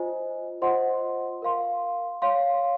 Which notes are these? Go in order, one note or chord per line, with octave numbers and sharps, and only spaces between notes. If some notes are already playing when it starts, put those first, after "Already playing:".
Already playing: F4 C5 D#5 G#5
F4 C5 D#5 F#5 C6
A#4 F5 C6
C#5 F5 C6